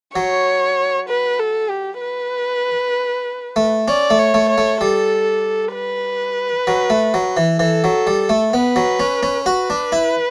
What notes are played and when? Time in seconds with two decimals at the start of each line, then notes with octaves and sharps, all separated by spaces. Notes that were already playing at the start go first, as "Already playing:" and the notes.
0.16 F#3 C#5
1.09 B4
1.39 A4
1.70 G4
2.02 B4
3.56 A3
3.88 C#4 D5
4.10 A3
4.19 C#5
4.34 A3
4.49 C#5
4.58 A3
4.81 G3 A4
5.74 B4
6.67 F#3
6.90 A3
7.14 F#3
7.37 E3
7.59 E3 A4
7.84 F#3
8.07 G3
8.29 A3
8.53 B3 B4
8.76 F#3
9.00 C#4
9.23 C#4
9.46 F#4 B4
9.70 D4
9.92 E4